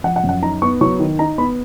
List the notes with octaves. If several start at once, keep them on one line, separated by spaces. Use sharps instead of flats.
F3 F#5
F#5
F#2
F#5
D#4 A#5
B3 C#6
F#3 C#6
D#3
D#4 A#5
B3 B5